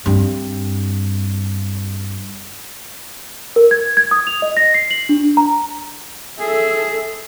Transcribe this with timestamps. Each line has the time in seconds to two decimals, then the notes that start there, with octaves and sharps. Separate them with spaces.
0.06 G2 C4
3.56 A#4
3.71 G#6
3.97 G#6
4.11 D#6
4.27 F7
4.42 D#5
4.57 A#6
4.74 C7
4.91 F#7
5.09 D4
5.37 A#5
6.39 G#4 A4 E5